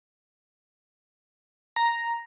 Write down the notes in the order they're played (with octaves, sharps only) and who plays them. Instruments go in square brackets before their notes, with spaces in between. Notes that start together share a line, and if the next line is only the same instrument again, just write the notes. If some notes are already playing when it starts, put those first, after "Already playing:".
[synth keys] A#5